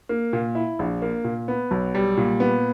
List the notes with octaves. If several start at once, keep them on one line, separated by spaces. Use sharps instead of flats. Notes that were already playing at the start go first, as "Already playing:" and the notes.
A#3
A#2
E4
A#1
A#3
A#2
B3
B1
G3
A#2
B3